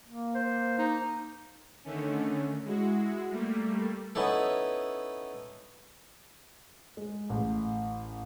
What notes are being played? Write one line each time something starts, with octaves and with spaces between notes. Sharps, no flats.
A#3
C5
D#4
D3 D#3 A3 C#4
G#3 E4 F#4
G3 A3 A#3
B3 C#4 D#4 E4 A4
G#3
A1